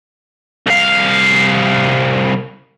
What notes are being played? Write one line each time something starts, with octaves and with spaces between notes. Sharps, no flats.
C2 F5